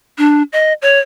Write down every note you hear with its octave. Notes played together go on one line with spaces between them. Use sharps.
D4
D#5
C#5